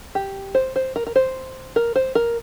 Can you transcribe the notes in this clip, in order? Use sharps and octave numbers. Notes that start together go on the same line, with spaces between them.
G4
C5
C5
A#4
A#4
C5
A#4
C5
A#4